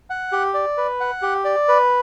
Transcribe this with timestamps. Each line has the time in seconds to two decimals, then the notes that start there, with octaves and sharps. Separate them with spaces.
0.10 F#5
0.32 G4
0.54 D5
0.77 B4
1.00 F#5
1.22 G4
1.45 D5
1.68 B4